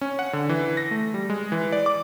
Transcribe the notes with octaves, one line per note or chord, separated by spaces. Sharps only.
C#4
F#5
D3
E3
A#6
A3
G3
G#3
E3
D5
D6